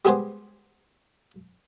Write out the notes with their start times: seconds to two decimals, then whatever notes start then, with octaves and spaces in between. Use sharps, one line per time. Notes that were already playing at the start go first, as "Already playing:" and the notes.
0.05 G3 G#3 B3 G#4 B4 C5